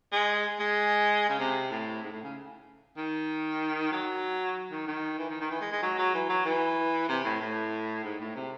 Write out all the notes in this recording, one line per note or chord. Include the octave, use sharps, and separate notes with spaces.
G#3
G#3
C#3
C3
A2
G#2
A2
C#3
D#3
F#3
D#3
D#3
E3
D#3
D#3
E3
G#3
G#3
F#3
F#3
E3
F#3
E3
C3
A2
A2
G#2
A2
C3